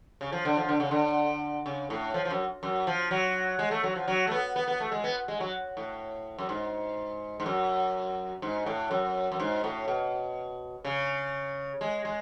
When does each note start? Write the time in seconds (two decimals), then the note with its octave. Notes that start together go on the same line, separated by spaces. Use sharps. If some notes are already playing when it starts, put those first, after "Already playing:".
0.21 C#3
0.32 F3
0.45 D3
0.57 F3
0.69 D3
0.80 C#3
0.91 D3
1.66 C#3
1.90 A2
2.14 F3
2.25 F3
2.31 F#2
2.63 F#2
2.87 F3
3.11 F#3
3.59 G#3
3.71 A3
3.84 F#3
3.96 F3
4.08 F#3
4.27 A3
4.32 B3
4.56 B3
4.68 B3
4.80 A3
4.92 G#3
5.04 B3
5.28 G#3
5.40 F#3
5.77 A2
6.39 F#2
6.49 G#2
7.40 G#2
7.46 F#2
8.42 G#2
8.66 A2
8.91 F#2
9.32 F#2
9.40 G#2
9.64 A2
9.88 B2
10.85 C#3
11.81 G#3
12.05 G#3